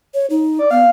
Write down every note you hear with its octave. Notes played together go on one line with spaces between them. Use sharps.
C#5
D#4
D5
B3 F5